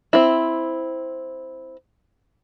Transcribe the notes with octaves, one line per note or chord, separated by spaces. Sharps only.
C4 E4